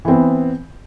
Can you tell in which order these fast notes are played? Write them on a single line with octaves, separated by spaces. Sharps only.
E3 C4 B3